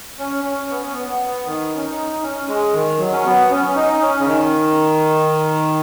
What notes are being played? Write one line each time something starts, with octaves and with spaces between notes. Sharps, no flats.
C#4
C#4
B3
C#4
B3
B3
D#3
C#4
D#4
C#4
G#3
D#3
F#3
C#4
B3
C#4
C#4
D#4
C#4
C#3
D#3